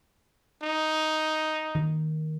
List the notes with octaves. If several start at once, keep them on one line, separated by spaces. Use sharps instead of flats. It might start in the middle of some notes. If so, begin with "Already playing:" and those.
D#4
D#3